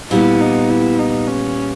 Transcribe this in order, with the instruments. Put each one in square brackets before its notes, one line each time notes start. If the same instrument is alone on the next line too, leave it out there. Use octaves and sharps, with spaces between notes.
[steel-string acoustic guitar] A#2 G3 B3 [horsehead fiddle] E4
[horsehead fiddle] D#4
E4
D#4
C#4